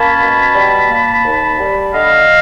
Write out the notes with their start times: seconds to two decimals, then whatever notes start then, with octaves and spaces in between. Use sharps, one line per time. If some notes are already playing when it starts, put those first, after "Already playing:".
Already playing: A#3 C#4 A5 B5
0.18 B2
0.54 G3
0.89 A#3
1.24 D#2
1.59 G3
1.93 D3 D#5 F5